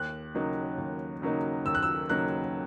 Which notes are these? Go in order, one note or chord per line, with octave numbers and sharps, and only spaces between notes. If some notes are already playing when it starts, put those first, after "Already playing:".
Already playing: D#2 F#6
C#3 F#3 A#3 D#4
D#2
C#3 F#3 A#3 D#4
D#2 E6
F#6
E6
C#3 F#3 A#3 D#4 F#6